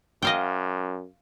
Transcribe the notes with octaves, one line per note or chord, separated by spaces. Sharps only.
F#2 D#5 F5 G5